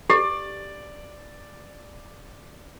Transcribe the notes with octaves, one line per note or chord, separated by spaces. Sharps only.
G4 D5